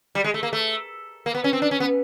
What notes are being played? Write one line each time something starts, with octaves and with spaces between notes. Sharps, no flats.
G3
G#3
A3
A#3
A3
A#3
B3
C#4
C4
D4
C#4
B3